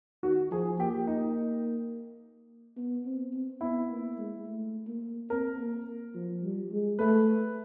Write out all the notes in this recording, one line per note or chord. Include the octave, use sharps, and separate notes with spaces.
D#3 F#4
F3 G#4
A#3 G4
D#4
B3
C4
C4
B3 E4
A#3
G#3
A3
A#3
C4 A#4
A#3
F3
G3
G#3
A3 B4